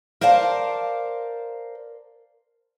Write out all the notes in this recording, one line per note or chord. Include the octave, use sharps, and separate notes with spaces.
A#4 C5 D5 F5 F#5 A5